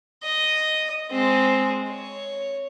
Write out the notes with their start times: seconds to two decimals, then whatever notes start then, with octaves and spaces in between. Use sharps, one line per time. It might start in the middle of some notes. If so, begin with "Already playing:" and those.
0.24 D#5
1.11 G#3 C4
1.90 C#5